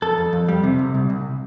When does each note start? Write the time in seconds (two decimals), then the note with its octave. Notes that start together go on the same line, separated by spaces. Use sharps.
0.02 F2 A4
0.18 F2
0.33 F2
0.49 G3
0.63 C3
0.79 C2
0.94 C2
1.10 C2